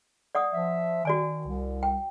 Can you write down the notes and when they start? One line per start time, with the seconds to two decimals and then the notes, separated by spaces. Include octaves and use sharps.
0.35 D5 F#5 D#6
0.53 F3 E5
1.05 D#3 F#4 D5 G#5
1.47 C2
1.83 G5